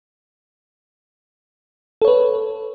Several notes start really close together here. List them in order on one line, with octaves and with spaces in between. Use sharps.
A4 C#5 B4